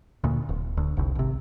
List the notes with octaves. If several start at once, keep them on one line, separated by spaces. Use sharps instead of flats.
D2 A#2
D1
D2
F1 C2
G#1 C3